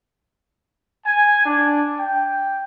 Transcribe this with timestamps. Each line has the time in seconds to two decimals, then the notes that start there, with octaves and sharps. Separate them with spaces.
1.05 G#5
1.44 D4
1.97 G5